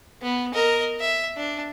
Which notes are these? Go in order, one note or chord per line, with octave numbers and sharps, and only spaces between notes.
B3
A#4 D#5
E5
D4